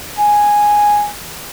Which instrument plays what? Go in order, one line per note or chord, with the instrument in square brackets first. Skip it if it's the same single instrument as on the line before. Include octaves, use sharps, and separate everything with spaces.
[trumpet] G#5